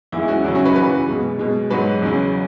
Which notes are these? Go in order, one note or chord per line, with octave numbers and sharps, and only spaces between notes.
E2 E3 G#3 E4
C#4 F#4
E2 C#3 F#3 E4
C#4 F#4
F#4 B4
F#2 C#3 E3 F#4 B4
B2 G#3
B2 G#3
G#2 F#3 F#4 B4
E2 C#3 F#3